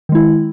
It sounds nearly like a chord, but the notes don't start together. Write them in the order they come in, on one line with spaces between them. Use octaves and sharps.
D#3 G#3 E4